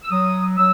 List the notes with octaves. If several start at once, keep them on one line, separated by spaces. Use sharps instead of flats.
E6
F#3 D#6
F#3 E6